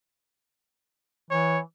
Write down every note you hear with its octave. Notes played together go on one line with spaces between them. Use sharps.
E3 C#5